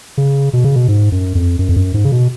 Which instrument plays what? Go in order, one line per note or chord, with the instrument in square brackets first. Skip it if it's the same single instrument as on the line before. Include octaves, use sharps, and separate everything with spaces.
[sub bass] C#3
B2
C#3
B2
G#2
F#2
F2
F#2
F2
F#2
G#2
C#3
B2